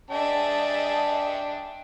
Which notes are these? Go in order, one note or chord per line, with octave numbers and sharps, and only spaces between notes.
D4 G#4 D#5 E5 G5 A5